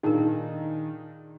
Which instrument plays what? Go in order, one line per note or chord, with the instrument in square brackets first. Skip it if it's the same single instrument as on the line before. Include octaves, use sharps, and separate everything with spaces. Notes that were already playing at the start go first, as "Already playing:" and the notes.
[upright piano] A#2 D4 G#4 [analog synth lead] D#3 [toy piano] D#4 A#4